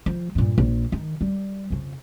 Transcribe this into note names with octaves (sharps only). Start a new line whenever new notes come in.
F3
G2 A#2
A#1
D#3
G3
F2 C#3